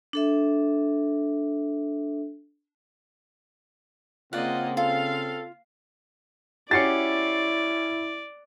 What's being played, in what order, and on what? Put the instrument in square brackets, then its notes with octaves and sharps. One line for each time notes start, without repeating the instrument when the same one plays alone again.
[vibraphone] D4 A4 E5
[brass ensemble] C#3 C4 [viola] A#3 D#5 [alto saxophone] F4 [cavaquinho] D5 F#5
[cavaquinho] F4 [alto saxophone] A4 [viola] F5
[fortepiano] C#4 F#4 G4 [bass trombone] E4 [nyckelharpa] D5 [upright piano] A6 C7 C#7